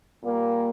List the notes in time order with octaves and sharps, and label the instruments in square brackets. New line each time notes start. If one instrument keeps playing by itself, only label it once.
[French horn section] A#2 G3 A#3